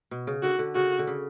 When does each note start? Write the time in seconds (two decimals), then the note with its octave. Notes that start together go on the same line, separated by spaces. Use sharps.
0.11 B2
0.27 C#3
0.43 D3 F#4
0.59 D3
0.75 C#3 F#4
0.99 D3
1.07 C#3